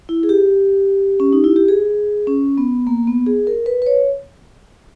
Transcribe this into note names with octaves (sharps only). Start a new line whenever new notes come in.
E4
G#4
G4
C#4
D#4
E4
G4
G#4
C#4
B3
A#3
B3
G#4
A#4
B4
B4
C#5